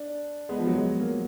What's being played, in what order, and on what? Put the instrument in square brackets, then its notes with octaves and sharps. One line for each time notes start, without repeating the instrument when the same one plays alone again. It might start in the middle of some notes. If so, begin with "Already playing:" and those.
Already playing: [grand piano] D4
G#3 B3
F3
F#3
F3 G#3
F#3 A#3